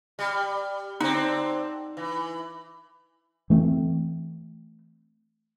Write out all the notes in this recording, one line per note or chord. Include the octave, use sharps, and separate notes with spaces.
G3
D3 C4 D#4
E3
E3 A3 A#3 C4